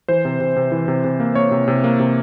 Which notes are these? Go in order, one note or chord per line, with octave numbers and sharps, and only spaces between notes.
E3 C5
C3
C3
C3
E3
C3
C3
A#3
A#3 C#5
C3
C3
A#3
C3